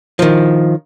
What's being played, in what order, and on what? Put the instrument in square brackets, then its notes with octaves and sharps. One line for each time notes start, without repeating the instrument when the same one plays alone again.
[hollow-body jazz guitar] D#3 F3